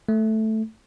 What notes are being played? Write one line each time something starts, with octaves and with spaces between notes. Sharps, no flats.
A3